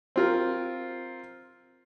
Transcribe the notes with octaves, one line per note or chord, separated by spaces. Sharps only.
C4 F4 A#4